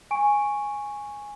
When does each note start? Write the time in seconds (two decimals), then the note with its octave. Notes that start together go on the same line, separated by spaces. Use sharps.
0.11 G#5 C#6 D7